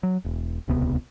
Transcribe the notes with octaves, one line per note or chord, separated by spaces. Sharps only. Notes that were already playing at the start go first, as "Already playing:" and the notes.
F#3
E1
D#1 C#2 C3 B3